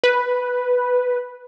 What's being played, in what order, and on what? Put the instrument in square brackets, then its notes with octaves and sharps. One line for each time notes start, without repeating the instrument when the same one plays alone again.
[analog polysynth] B4